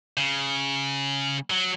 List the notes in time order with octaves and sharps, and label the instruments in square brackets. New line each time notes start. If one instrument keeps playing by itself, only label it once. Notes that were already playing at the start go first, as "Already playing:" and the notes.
[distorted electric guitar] C#3
F#3